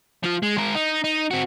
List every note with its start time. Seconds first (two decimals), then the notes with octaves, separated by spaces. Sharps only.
0.23 F3 F4
0.43 G#3
0.58 G#3 A#4
0.75 D#4
1.04 D#4
1.31 C4 F#4